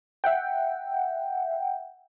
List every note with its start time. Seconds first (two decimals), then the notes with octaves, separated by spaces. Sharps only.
0.24 E5 F#5 G5